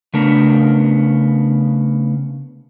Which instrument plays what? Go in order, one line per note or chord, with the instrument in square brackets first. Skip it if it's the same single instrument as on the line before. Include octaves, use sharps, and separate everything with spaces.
[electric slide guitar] C#3 A3 B3 D4 A#4